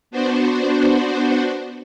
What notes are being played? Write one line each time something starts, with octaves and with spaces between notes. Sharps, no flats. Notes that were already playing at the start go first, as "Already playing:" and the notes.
B3 D4 F#4 C5